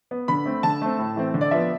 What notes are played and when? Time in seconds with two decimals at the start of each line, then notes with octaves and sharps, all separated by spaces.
0.11 B3
0.28 D3 B5
0.45 A3 C4
0.63 D3 A5
0.82 A3 C4
0.99 A2
1.16 E3 A3 C4
1.34 D3
1.41 D5
1.51 F3 B3 E5